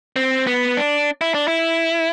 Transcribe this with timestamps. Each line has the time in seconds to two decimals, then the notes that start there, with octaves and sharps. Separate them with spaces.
0.16 C4
0.47 B3
0.77 D4
1.21 E4
1.34 D4
1.48 E4